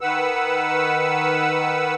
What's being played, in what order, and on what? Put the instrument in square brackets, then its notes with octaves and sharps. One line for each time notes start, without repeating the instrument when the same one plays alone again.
[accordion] D#3 B4 F#5 E6